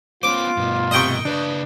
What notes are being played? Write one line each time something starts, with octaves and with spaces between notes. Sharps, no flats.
B3 C#4 F4 C5 D6
G2 B2
C3 D#5 G5 C#6 D#6
C#3 D4 B4 D5